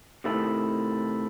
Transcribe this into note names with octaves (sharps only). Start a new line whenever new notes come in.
C3 D#3 A3 E4